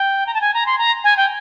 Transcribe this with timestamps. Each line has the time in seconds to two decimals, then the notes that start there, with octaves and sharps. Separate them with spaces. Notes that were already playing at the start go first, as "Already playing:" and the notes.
Already playing: G5
0.27 A#5
0.34 A5
0.41 G#5
0.54 A#5
0.66 C6
0.78 A#5
1.04 G#5
1.17 G5